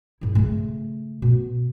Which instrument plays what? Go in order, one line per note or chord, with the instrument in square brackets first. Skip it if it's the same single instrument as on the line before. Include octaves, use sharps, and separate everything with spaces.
[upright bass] G#2 E4
C#3 A3
B2